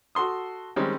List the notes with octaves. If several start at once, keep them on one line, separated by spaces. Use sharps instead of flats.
F#4 A4 C6 D#6
D#3 G3 G#3 C4 C#4